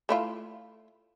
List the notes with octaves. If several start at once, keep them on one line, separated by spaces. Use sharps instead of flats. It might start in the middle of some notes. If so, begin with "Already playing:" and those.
A3 E4 F4